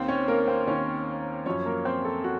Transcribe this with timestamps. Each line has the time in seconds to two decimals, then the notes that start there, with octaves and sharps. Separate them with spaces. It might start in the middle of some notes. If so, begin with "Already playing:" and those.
Already playing: D#2 D#3 C4 C5
0.08 C#4 C#5
0.28 A#3 A#4
0.48 C4 C5
0.67 D#2 D#3 C#4 C#5
1.46 F#2 F3 C#4 C#5
1.66 A#3 A#4
1.85 C4 C5
2.05 A4
2.24 F#4